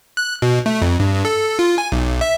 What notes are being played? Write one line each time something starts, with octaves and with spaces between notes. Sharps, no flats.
F#6
B2
A3
F2
G2
A4
F4
G#5
B1
E5